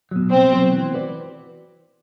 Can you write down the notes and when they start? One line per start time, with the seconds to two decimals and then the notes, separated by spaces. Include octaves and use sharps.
0.11 B2 F#3
0.31 C2 C4
0.52 B2 F#3
0.72 E3
0.91 B3 F#4 B4 D5